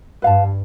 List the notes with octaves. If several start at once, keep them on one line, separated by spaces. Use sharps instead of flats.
G2 B4 F5 A5